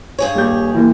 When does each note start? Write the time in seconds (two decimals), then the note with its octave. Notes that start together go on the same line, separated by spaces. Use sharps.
0.19 G2 G#4 C#5
0.35 D#1 G4 G6
0.75 D#2 E3